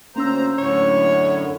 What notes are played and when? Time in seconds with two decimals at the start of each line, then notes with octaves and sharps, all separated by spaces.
0.16 D2 A#3 C#4 C5 A#5 E6
0.58 F#2 A2 D3 C#5